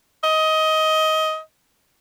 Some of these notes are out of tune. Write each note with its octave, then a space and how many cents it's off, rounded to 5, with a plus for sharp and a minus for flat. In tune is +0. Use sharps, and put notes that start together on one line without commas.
D#5 +20